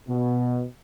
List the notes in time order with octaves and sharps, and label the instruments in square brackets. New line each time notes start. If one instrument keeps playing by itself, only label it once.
[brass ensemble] B2